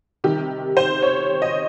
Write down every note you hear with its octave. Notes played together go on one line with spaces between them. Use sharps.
C3 D#3 G3 G4
C5
C#5
D#5